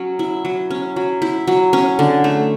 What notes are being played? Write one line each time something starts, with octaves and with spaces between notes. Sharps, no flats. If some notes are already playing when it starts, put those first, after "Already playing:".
Already playing: F#3 C#4
E4
F#3
C#4
F#3
E4
F#3
C#4
D3
A3